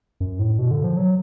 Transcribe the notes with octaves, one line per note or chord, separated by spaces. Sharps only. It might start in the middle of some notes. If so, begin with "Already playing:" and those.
F#2
A2
B2
D3
F3
F#3